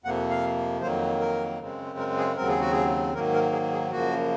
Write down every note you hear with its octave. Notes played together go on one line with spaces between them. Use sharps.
F2 C3 F3 A#3 F#5
F5
F2 D#3 F#3 A#3 C5
A#4
F#2 C#3 G#3 C4
A#4
G#4
D#2 C#3 F#3 C4 A#4
G#4
F#4
G#4
G#2 D#3 F#3 A#3 A#4
A#4
G#4
G#4
F#2 C#3 F3 A#3 F#4